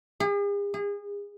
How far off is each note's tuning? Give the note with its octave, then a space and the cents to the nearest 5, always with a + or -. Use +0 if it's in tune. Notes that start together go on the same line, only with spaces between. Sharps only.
G#4 -45
G#4 -30